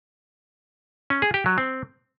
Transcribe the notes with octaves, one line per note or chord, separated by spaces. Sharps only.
C#4
G#4
G4
F#3
C4